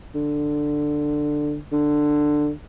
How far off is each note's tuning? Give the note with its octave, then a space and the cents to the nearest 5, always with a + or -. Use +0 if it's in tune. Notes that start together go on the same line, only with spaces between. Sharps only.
D3 +10
D3 +10